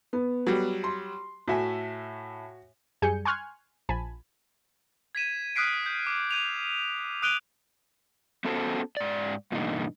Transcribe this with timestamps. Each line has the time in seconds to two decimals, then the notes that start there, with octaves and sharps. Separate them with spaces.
0.13 B3
0.47 F#3 G3
0.84 C6
1.48 A2 F#4 E5 G#5
3.02 F#2 G3 G#4 G#5 G6 C#7
3.25 G#5 C6 C#6 F6 F#6 G#6
3.89 A#1 F3 G#5 A5 B5
5.15 G#6 B6 D#7 E7
5.56 D#6 F6 F#6 B6 C7 D7
5.86 G6
6.07 D6
6.31 G6 D#7 F7
7.22 D#6 F#6 D7 D#7 F7 G7
8.45 B3 C#4 F#4 A4 C5
8.97 G#2 D5
9.52 G2 B2 E3 A#3 D4 D#4